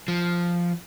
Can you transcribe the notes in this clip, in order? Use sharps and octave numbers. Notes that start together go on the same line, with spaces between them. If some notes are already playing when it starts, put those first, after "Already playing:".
F3